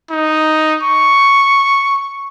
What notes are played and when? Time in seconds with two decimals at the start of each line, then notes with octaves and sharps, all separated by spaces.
0.10 D#4
0.83 C#6